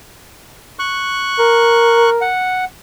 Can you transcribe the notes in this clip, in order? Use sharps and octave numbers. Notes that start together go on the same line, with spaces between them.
C#6 F#6
A#4
F#5